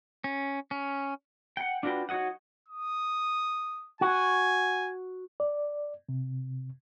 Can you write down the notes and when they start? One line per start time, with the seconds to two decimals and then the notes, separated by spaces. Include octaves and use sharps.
0.24 C#4
0.71 C#4
1.57 F#5 G5
1.83 D4 F4 F#4 B4 G5
2.09 D#4 F#4 C#5 D#5 F#5
2.68 D#6
4.01 F#4 G#5
5.40 D5
6.09 C3